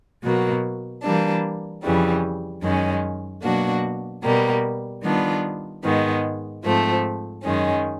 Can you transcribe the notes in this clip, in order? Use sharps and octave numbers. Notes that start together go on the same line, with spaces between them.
B2 F#3 A#3
E3 G3 A#3 D4
F2 C#3 E3 G3
F#2 D#3 G#3 C#4
B2 F#3 A#3 D4 F#4
B2 G3 A#3
D#3 G3 B3 D4 F4
G#2 D#3 G#3 B3
G#2 F3 A3 C4
F#2 D#3 G#3 C#4